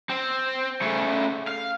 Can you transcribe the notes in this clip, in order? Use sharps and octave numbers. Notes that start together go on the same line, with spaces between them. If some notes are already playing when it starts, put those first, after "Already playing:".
C4
C#3 A3
F5